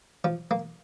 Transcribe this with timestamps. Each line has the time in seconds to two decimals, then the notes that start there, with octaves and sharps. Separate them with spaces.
0.24 F3
0.51 A#3